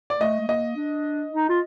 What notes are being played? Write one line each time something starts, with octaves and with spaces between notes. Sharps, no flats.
D5
A3 D#5
A3
A#3 D#5
D4
D#4
F4